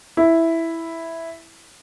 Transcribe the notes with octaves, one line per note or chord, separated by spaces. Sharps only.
E4